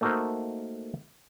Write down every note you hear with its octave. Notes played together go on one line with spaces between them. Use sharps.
A3 A#3 D#4 F#4 A#4 C5